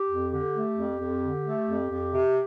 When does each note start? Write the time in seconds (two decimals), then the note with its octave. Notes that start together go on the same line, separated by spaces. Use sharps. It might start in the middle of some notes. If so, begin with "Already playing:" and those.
Already playing: G4
0.10 F2
0.32 D3 G4
0.55 A3
0.77 F2
1.00 F2
1.23 D3
1.45 A3
1.67 F2
1.90 F2
2.13 C3